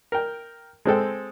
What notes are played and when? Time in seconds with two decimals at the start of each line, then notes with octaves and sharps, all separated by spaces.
0.12 A#4 G5
0.85 G#3 C4 A4 G5